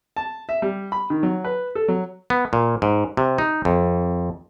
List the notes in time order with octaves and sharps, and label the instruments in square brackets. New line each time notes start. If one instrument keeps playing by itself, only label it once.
[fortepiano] A5
E5
G3
B5
D#3
F#3
B4
A4
F#3
[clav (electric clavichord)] B3
A#2
G#2
C3
D#4
F2